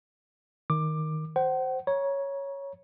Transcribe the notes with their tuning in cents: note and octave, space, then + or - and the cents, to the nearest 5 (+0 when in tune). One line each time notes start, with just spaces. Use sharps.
D#3 +0 D6 +15
C5 +0 F#5 +40
C#5 +0 A#5 +35